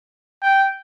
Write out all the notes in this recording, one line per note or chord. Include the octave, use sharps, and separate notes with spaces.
G5